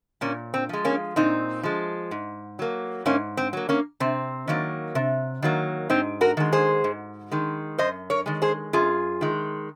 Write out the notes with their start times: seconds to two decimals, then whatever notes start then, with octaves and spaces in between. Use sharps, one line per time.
0.21 A#2 A#3 C#4
0.54 C4
0.69 F3 G#3
0.85 A#3 C#4
1.16 A#2 C4 D#4
1.63 F3 G#3
2.11 G#2
2.59 F#3 A#3
3.06 G#2 A#3 C#4
3.37 C4
3.53 F#3 A#3
3.69 A#3 C#4
4.00 C3 C4
4.47 D#3 F#3 A#3
4.95 C3
5.42 D#3 F#3 A#3
5.90 G#2 C4 D#4
6.21 F#4 A#4
6.37 D#3 G#3
6.53 G#4 C5
6.84 G#2
7.31 D#3 G#3
7.78 F#2 C5 D#5
8.10 A#4 C#5
8.26 D#3 G#3
8.42 G#4 C5
8.73 F#2 F4 G#4
9.21 D#3 G#3